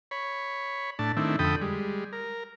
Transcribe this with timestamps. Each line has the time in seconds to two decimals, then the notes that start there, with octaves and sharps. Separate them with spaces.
0.11 C#5 B5
0.99 A2 D4 A5
1.17 D#3 A3 C4 D4 E4
1.39 F2 D3 A4 G5 B5 D#6
1.62 G3 G#3
2.13 A#4